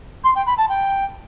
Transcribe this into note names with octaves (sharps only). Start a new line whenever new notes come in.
C6
G5
B5
A5
G5